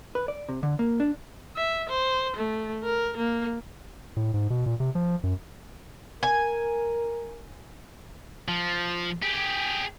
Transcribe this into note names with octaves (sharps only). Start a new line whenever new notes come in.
B4
D5
C3
D3
A#3
D4
E5
C5
A3
A#4
A#3
A2
G#2
B2
A#2
C3
F3
F#2
A#4 G#5
F3
G4 G#4